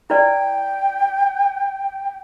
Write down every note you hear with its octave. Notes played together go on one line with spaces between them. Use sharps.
E4 B4 D5 G5